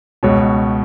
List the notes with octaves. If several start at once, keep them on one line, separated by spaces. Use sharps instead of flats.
C#2 B2 C#5